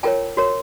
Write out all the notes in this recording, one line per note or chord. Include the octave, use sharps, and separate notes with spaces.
F4 A#4 C#5 G5 A5
F#4 A#4 C#5